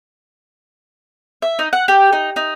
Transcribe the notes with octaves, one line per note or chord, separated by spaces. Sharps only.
E5
D#4
F#5
G4
D#4
D#4